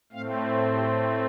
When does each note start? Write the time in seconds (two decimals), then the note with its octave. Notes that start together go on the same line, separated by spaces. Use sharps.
0.12 A2 A3 C4 F5
0.74 G4